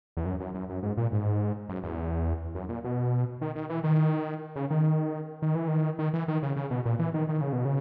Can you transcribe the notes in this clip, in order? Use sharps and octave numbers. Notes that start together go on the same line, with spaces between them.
E2
F#2
F#2
F#2
F#2
G#2
A#2
G#2
F#2
E2
F#2
A#2
B2
D#3
D#3
E3
D#3
C#3
D#3
D#3
E3
D#3
D#3
E3
D#3
C#3
C#3
B2
A#2
E3
D#3
D#3
C#3
B2
C#3